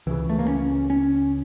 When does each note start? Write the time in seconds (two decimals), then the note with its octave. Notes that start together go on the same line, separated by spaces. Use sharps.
0.07 C#2 C#3 E3
0.30 A3
0.39 A#3
0.48 C#4
0.90 C#4